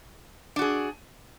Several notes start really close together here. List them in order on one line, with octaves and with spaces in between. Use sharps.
D4 F#4 G#4